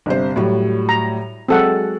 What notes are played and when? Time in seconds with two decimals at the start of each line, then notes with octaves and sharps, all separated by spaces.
0.06 G1 C3 C5
0.36 A2 F#3 G3
0.89 A#5
1.49 F#3 G#3 C4 A4 F#5